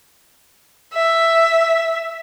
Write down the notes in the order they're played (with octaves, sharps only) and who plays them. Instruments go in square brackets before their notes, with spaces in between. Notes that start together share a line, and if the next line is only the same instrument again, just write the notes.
[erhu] E5